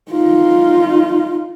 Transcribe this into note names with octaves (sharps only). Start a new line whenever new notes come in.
D#4 F4